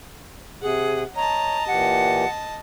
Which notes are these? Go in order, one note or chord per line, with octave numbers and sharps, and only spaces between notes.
C3 G#4 F#5
C#5 D#5 A5 A#5
A#2 E3 G4 F#5